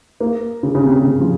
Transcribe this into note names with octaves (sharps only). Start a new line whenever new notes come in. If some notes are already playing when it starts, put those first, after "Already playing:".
A#3
C#3
C#3
C3
C3
C#3
F3